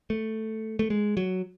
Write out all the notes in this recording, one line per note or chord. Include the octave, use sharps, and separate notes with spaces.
A3
A3
G#3
F#3